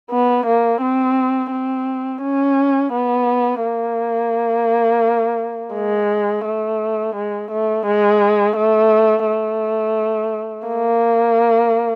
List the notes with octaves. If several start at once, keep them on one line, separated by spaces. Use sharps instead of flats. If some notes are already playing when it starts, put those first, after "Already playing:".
B3
A#3
C4
C4
C#4
B3
A#3
G#3
A3
G#3
A3
G#3
A3
A3
A#3